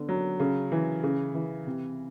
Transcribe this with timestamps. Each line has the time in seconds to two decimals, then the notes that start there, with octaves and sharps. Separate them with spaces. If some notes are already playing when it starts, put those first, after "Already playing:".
Already playing: D3 B3
0.09 F#3
0.40 C#3
0.72 E3
1.03 C#3
1.35 E3
1.67 C3